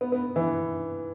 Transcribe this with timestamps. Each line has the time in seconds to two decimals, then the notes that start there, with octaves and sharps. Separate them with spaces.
0.01 B3
0.12 B3
0.36 E3